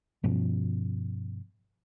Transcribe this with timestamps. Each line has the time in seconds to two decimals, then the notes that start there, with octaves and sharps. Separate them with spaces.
0.23 G2 B2 F3 C#4